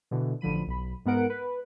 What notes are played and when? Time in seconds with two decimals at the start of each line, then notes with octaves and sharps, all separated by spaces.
0.11 B2 D3 E3
0.41 A1 D3 F3 B5 D#7
0.67 B1 B5
1.05 G#2 B3 A#4 F#5 D7
1.30 B4